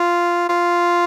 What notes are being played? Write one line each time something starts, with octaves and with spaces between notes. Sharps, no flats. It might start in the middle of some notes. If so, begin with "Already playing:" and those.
Already playing: F4
F4